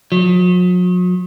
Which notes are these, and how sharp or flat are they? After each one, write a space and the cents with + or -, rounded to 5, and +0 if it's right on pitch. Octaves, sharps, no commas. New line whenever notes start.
F#3 -45